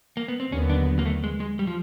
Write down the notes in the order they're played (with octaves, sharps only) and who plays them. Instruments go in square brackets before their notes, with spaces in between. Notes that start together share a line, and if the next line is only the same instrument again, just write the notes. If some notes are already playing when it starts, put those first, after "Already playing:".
[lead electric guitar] A#3
B3
C4
[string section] D#2 D3 F#3 B3 [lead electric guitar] C#4
[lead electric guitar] D4
A#3
A3
G#3
G#3
G3
F3